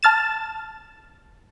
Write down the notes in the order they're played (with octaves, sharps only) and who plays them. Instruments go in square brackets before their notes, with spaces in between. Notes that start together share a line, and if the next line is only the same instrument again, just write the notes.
[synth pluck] A5 F6 A6 E7